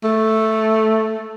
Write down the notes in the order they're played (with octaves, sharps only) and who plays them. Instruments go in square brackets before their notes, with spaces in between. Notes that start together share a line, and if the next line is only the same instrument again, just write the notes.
[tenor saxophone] A3